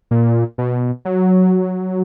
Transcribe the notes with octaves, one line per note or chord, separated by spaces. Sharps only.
A#2
B2
F#3